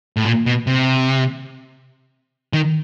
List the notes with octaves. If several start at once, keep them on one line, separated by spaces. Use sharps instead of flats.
A2
A#2
B2
C3
D#3